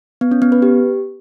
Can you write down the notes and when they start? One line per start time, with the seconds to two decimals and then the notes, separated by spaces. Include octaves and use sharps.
0.21 B3
0.31 C#4
0.42 B3
0.52 B4
0.62 G4